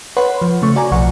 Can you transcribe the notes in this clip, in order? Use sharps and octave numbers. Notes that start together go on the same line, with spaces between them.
B4 C#5 F#5 B5 C6
F3
C#3 A3 C#6
F#4 D5 G#5 A#5
B1 F3 F#5 C#6